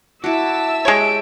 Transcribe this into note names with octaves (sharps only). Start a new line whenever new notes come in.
E4 F#4 E5 A5 D6 E6
G#3 G4 C#5 D7